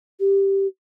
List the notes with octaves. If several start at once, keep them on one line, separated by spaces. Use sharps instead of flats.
G4